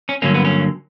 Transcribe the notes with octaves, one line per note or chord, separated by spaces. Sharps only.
C#4
G2 D3 F#3 A#3 C#4
B3
C#4